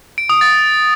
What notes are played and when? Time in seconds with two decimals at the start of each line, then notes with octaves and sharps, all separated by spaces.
0.18 D7
0.29 D#6
0.41 A6